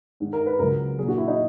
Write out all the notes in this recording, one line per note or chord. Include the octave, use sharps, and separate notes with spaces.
G#2 D#3 G#3
A#4
B4
C#2 C#3 F#3 A#4
A#2 F#3 G#4
F#4
E4
D#4